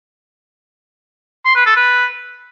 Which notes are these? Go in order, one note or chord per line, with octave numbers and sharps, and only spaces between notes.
C6
B4
A4
B4